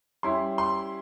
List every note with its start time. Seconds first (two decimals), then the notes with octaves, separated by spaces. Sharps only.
0.23 G3 C#4 E4 C6
0.58 C6